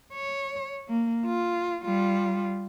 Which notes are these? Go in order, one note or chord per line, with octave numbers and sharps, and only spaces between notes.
C#5
A#3
F4
G3 F4